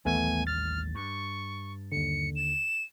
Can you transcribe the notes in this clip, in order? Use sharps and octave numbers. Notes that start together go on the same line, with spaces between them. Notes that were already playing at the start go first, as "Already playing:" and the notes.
A1 D#2 E3 G3 A3 B3 G#5
F6 A6
G2 C#6
D#2 D3 C#7
E7